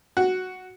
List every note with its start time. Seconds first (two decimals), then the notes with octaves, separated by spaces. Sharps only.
0.17 F#4